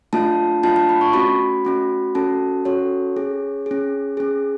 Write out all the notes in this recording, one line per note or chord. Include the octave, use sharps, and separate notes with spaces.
A3 D4 F4 A5
A3 D4 F4 A5
A5
B5
C#6
A3 C#4 F#4 B5
A3 C#4 F#4
C#4 F#4 A4 A5
C#4 F#4 A4 C#5
C#4 G#4
C#4 G#4
C#4 G#4